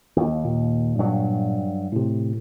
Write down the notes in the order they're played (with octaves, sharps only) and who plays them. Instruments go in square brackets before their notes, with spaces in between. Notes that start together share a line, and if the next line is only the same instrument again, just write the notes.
[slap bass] D#2
[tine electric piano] A#2
[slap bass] G2 F#3
[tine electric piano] A2 C3